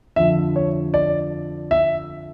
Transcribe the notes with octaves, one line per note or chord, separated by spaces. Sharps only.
F2 D3 F3 E5
C#5
D5
E5